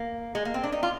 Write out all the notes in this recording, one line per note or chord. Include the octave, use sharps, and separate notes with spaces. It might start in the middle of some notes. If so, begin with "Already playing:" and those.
Already playing: A#3
G#3
A#3
C4
D4
D#4
F4